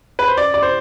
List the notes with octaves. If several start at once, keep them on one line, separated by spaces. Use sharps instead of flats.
B4
C5
D5
D5
C5